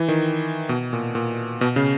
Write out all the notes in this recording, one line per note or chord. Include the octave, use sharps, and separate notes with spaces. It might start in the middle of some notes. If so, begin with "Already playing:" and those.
Already playing: E3
D#3
B2
A#2
A#2
B2
C#3